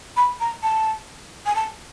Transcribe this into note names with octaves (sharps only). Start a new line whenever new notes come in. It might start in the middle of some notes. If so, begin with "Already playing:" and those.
B5
A#5
A5
G#5
A5